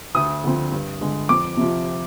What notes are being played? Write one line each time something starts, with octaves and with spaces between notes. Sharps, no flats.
D2 D#6
D3 F3 C4
G2
D3 G#3
F2 D6
C3 F3